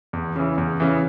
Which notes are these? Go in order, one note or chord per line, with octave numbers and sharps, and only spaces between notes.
E2
C#3 E3
E2
C#3 E3